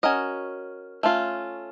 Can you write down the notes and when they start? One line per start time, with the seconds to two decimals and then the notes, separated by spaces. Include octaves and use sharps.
0.03 C#4 F#4 A#4 D#5
1.03 A3 C#4 F4